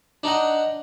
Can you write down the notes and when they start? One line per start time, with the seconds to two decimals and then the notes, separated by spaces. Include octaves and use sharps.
0.23 D4 D#4 D#5 F#5